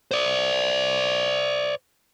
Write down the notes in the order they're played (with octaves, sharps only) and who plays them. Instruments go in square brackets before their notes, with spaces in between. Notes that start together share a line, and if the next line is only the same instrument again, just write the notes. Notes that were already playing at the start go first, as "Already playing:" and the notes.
[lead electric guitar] C5 D5